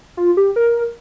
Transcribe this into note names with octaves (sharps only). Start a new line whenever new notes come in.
F4
G4
A#4